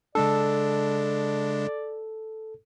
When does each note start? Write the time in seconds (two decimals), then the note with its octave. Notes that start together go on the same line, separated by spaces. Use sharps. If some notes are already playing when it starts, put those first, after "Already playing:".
0.15 C#3 G#3 D4 A4 D5